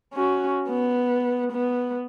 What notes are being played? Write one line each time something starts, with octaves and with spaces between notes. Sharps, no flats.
C#4 F#4
B3
B3